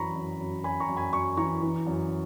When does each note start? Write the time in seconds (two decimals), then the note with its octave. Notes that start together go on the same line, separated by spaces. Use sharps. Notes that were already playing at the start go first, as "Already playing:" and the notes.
Already playing: F#2 E3 A#5 B5 C#6
0.15 F#2
0.40 F#2
0.64 F#2 G#5 B5
0.80 A#5 C#6
0.89 F#2
0.97 G#5 B5
1.13 F#2 C#6
1.37 E3 A#5 C#6
1.62 E3
1.86 F#2